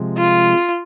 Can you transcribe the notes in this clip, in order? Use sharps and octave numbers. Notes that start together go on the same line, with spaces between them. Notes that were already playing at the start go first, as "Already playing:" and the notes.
Already playing: C3 F3 G#3
F4